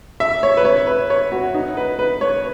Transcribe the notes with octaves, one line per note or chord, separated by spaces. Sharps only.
E5
C#5
B4
C#5
B4
C#5
F#4
D#4
B4
B4
C#5